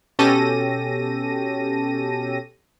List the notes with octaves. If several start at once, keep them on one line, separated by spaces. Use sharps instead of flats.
B2 C#4 G4 A4 A#6 D#7